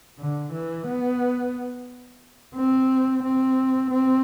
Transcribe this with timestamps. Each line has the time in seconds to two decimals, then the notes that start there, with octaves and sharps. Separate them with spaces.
0.19 D3
0.53 E3
0.87 B3
2.56 C4
3.23 C4
3.91 C4